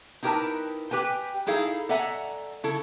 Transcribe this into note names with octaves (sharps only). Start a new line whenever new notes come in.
D#4 E4 G4 A#4 B4 A5
G4 B4 G5 G#5
D#4 E4 G#4 A4 F5
A4 D5 E5 F#5 G#5 A#5
C#3 E4 A4